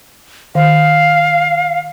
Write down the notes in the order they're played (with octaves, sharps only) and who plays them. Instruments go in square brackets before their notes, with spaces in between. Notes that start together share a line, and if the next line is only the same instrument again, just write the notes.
[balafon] D#3 [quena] F5